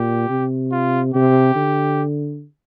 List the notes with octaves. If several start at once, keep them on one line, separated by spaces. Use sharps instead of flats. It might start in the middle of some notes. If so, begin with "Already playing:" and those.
Already playing: A#2 G4
C3
F4
C3 G4
D3